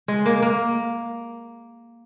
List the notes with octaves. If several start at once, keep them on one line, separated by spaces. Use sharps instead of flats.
G#3
A#3
A#3